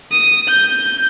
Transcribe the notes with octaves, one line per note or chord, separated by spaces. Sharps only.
D#6
G6